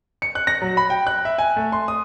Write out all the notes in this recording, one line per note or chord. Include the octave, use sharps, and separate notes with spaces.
C#7
F#6
A#6
F#3
B5
G5
F#6
E5
G#5
A3
C6
D#6